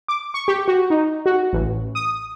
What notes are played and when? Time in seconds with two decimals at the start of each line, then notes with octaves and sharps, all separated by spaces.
0.08 D6
0.34 C#6
0.48 G4
0.68 F#4
0.90 D#4
1.26 F#4
1.53 A1
1.95 D#6